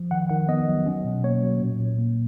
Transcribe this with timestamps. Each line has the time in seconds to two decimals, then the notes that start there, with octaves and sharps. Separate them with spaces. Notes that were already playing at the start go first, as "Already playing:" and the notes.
Already playing: F3
0.11 D#3 F#5
0.30 D#3 F#5
0.49 B3 D#5
0.68 F#3
0.86 C#4
1.05 B2
1.23 A#3 C#5
1.43 F#3
1.61 A#2
1.80 A#2
1.99 A#3